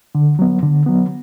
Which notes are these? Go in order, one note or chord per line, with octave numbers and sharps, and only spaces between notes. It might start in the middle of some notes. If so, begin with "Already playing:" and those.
D3
F#3 B3
D3
F#3 B3